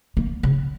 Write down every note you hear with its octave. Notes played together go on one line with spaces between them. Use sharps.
A#3
C#3